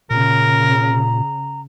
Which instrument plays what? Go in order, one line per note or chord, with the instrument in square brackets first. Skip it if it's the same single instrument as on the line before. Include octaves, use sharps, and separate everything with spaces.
[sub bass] A#2 [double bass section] C#3 [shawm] A#4 [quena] A#5